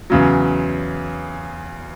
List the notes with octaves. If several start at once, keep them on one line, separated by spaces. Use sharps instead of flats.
E2 C#3 F#3